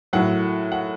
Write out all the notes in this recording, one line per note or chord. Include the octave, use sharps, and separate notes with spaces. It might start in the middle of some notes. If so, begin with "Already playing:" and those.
A2 F#3 F#5
F#5